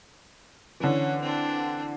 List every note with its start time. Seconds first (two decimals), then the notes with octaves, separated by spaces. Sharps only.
0.80 D3 E3 C#4
1.21 C4 D4